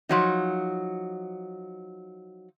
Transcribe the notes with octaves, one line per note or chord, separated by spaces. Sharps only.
F3 F#3 D#4